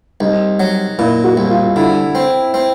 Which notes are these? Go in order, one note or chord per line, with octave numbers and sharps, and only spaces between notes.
C2 D#4
F#3
A#2 E4
F#4
C2
F4
D3 E4
C4
C4